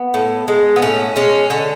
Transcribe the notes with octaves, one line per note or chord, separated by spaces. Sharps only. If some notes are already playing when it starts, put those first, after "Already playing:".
Already playing: B3
A2
G#3
B3
A2 C#4
G#3 C#4
D3 C#4